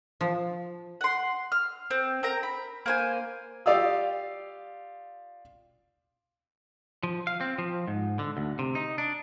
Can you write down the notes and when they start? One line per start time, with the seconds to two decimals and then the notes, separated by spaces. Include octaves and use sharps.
0.21 F3
1.01 F#5 C6
1.52 F6
1.91 C4
2.23 C4 A#4 A#5
2.43 B5
2.86 A#3 C5 G#5
3.66 F4 G4 D5 F5 D#6 E6
7.03 F3
7.27 F5
7.41 C4
7.58 F3
7.87 G#2
8.19 D3
8.37 D2
8.59 C3
8.75 D#4
8.98 D4